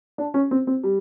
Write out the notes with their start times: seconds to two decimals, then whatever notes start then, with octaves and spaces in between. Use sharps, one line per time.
0.18 D4
0.34 C#4
0.51 C4
0.67 C4
0.83 G3